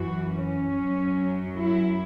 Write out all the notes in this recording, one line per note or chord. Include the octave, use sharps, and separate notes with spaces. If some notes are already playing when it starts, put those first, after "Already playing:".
Already playing: F#2 E3 F#4
C#4
F#2 F#3
E4